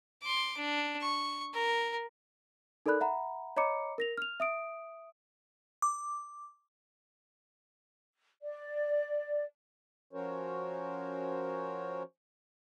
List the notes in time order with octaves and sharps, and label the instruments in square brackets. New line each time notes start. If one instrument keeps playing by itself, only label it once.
[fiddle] C6 D6
D4
C#6
A#4
[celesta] D#4 A4 A#4 D5 B5 F#6
E5 F#5 A#5 B5
C#5 D#5 A#5 B5 D6 C#7
A#4 A#6 F7
F6 F7
E5 D#6 D7
[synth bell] D6
[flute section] D5
[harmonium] F3 C#4 F#4 A#4 C5 C#5